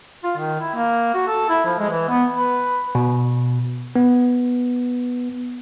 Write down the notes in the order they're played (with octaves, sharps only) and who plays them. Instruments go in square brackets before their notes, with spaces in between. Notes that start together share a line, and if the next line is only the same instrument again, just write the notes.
[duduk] F4
D#3
E4
A#3
F#4
A4
E4
F3
G#3
E3
B3
B4
[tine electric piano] B2
B3